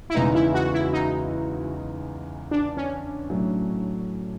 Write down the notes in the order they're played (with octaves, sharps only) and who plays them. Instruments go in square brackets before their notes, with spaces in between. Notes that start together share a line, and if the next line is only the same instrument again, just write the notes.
[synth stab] E4
[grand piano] E2 C#3 E3 G#3 B3 [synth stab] D#4
[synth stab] E4
F#4
E4
D#4
D4
C#4
[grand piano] A2 F#3 A3